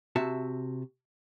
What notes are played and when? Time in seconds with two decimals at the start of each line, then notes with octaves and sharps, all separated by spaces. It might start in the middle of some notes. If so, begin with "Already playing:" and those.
0.16 C3 F#4 E5 A5